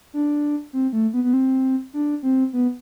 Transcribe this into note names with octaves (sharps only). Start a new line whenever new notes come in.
D4
C4
A3
B3
B3
C4
D4
C4
B3